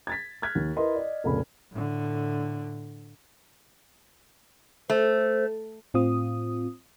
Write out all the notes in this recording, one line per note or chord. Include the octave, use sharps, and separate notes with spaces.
G#6 A6 B6
F6 F#6 G#6 B6
D#2
E4 A#4 B4 D#5 C6
D5 D#5
F1 C#2 A#2 B5
A2 D3
A3 C5
A2 C4 F4 D#6